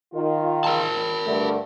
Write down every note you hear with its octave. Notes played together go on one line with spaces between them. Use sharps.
D#3 F4
A#4 A5
G2 D3 A3